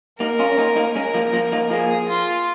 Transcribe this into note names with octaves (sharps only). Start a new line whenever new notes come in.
A#3 D#4 A#4
C#4 F4
C#4
A#3 D#4
A#3 D#4
G#3 C#4 A#4
F3 A#3
F3 A#3
A#3 D#4
F3 A#3 G#4
F4